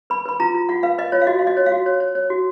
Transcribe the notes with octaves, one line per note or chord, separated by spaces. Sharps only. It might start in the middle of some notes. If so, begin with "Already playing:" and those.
B4 B5
B4 B5
F4 A#5
F4
F4 F#5
B4 F5
B4 D#5
F4 C#5
F5
F#4 D#5
F5
F#4
D#5
C#5
F5
F#4
C#5
C#5
C#5
F#4